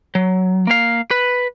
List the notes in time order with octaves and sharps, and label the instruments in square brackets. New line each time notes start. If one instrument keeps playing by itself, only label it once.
[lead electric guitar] F#3
A#3 F5
B4